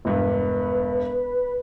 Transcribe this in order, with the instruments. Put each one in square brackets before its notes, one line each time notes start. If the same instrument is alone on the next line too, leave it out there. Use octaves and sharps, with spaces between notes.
[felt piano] E1 G2 [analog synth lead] B4